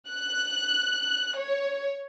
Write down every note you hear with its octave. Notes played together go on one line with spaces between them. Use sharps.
F#6
C#5